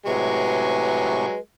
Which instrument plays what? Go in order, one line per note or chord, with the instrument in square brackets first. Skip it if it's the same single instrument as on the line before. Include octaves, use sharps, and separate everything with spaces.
[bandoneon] A2 C3 C#6 [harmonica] F#3 G#3 G#4 [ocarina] B4